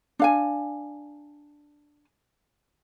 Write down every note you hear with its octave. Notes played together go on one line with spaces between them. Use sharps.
D4 F5 G#5